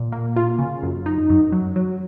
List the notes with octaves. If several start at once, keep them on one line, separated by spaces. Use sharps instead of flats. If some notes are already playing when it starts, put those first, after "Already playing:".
Already playing: A#2
A#3
F4
C#3
F#2
D#4
F#2
F#3
F#3